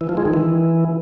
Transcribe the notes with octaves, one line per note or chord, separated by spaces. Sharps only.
E3
F3
G#3
D#3
E3